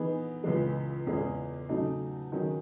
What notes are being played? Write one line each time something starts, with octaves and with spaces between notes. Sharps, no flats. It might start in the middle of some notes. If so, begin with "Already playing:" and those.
Already playing: E3 B3 D#4 G#4
C#2 C#3 E3 G#3
E2 C#3 G#3 C#4 G#4
C#3 F#3 A3 D#4
D#3 F#3 C#4 G#4